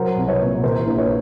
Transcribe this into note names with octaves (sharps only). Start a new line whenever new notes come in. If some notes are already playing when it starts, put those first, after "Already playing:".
Already playing: F#3 A#4 C5
C2
B4 C#5
A#2
E3 A#4 C5
A#1
B4 C#5